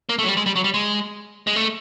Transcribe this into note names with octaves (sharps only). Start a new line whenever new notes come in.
A#3
A3
F#3
G3
G#3
G3
F#3
G3
G#3
G#3
A3